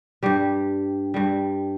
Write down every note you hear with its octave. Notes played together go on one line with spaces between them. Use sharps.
G2 G3 G4
G2 G3